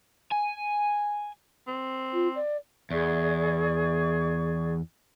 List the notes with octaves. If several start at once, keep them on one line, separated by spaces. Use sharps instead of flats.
G#5
C4
F4
D5
E2 G#4 D5 C#6